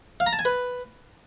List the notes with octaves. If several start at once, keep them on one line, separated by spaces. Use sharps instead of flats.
F5
A#5
A5
G#5
B4